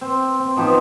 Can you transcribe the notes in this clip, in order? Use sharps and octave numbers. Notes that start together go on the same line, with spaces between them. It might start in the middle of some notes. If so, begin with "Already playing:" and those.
C4
C4
D#3 F3 B3 G4